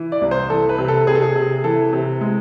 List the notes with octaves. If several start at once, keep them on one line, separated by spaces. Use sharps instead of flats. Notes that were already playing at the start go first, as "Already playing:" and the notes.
Already playing: E3
D5
C2
C5
E3 A4
B4
C3
A4
C3 G#4
A4
G#4
C3
E3 A4
C3
G#3